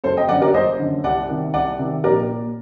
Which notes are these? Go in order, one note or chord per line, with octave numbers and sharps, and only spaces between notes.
F#1 A4 C5
D#5 G5
F#2 D3 D5 F#5
A#4 D5
F#1 C5 D#5
F#2 D3
C2 D5 F#5
C3 D#3
C2 D5 F#5
C3 D#3
A#1 A#4 D5
A#2